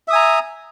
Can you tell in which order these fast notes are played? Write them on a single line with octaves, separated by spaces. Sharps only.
E5 D#6 G#5 A#5